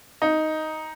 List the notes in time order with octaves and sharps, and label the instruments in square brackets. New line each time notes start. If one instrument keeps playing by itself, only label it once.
[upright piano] D#4